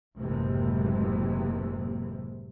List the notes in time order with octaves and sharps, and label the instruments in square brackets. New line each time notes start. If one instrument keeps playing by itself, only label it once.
[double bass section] F#1 D#2 A2 C3 E3 G#3